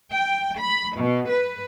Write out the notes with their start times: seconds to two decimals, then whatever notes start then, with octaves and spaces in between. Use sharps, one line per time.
0.15 G5
0.61 B5
0.98 B2
1.31 B4